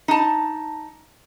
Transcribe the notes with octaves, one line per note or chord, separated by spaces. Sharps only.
D#4 A5